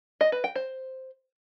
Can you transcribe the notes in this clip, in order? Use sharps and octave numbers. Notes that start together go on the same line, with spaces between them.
D#5
B4
G5
C5